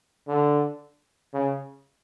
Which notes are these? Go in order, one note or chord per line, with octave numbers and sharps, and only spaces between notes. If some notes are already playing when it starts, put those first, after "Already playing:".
D3
C#3